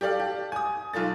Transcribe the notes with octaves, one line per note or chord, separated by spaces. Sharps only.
G4 A4 D5 F5
G4
G#5 D#6
B1 F4 A4 A6